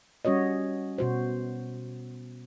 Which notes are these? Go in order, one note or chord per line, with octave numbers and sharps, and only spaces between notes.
G3 C#4 F#4 C#5 D#5
B2 F#4 C5